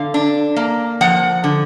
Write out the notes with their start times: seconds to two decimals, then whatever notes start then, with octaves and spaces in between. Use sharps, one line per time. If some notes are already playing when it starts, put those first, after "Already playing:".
Already playing: D3 F5
0.14 D4
0.56 A#3
1.01 F3 F#5
1.44 D3